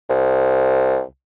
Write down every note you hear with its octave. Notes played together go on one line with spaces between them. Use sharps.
C2